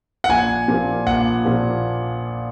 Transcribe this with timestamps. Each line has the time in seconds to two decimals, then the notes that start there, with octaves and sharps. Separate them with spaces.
0.24 F#5
0.29 A#1 G#5
0.68 A#2 F3 A#3
1.07 A#1 F#5
1.45 A#2 F3 A#3